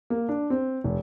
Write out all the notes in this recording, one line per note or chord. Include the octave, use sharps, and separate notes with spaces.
A#3
D4
C4
F1